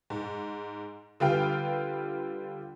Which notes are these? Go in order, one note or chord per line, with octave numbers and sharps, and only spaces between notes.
G#2
D3 G3 F4 B4 F5 G5